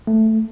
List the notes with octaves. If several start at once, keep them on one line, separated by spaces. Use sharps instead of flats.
A3